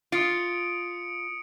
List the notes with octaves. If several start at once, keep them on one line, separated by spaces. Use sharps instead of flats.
F4 D#6 C#7 D7